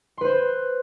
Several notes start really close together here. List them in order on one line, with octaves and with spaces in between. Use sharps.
C6 B4 C5